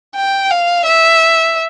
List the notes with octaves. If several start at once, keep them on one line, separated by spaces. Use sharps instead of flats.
G5
F5
E5